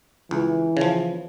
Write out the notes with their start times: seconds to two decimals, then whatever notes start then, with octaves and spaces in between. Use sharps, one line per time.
0.31 C#2 E3
0.77 C#3 F3